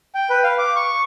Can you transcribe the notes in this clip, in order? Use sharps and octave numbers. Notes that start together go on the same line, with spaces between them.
G5
B4
F5
D6
C#6